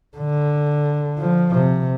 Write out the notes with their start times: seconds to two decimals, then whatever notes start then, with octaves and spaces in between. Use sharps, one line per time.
0.18 D3
1.18 F3
1.52 C3